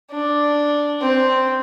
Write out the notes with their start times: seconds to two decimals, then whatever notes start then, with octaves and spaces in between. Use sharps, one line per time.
0.11 D4
1.02 C4